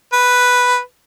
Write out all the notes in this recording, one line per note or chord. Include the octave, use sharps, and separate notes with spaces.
B4